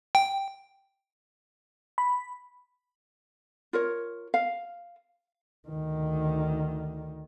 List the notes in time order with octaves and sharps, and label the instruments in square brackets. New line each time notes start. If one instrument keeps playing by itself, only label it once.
[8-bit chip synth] G5
[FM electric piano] B5
[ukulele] F4 A#4 C#5
F5
[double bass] D2 D#3